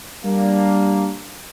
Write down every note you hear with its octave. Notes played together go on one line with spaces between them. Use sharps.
G3 A#3 D4